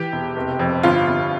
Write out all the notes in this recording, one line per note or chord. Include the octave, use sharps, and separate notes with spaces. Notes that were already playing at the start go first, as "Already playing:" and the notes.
Already playing: E3 G4
E1
F1
F2
G1 F4
G1